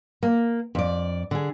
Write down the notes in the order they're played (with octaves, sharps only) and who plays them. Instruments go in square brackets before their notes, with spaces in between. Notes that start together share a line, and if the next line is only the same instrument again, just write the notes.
[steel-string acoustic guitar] A#3
F2 D5
D3 G#4